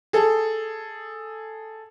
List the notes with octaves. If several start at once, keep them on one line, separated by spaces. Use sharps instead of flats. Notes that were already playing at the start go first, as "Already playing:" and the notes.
G#4 A4